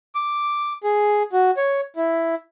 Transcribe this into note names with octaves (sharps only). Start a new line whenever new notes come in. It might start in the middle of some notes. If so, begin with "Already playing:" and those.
D6
G#4
F#4
C#5
E4